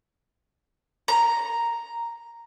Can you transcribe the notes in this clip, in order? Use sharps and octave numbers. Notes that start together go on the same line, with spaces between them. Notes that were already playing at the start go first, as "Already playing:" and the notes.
A#5